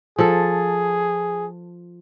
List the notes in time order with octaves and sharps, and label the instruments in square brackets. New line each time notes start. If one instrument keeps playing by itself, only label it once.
[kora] F3 A4 [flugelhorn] G#4